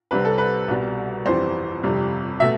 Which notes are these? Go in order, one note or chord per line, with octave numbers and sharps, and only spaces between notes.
C2 C3 G3 C4 B4
A4
B4
C2 B2 G3
G1 F2 E3 G3 C5
G1 F2 C3 G3
B2 A3 E5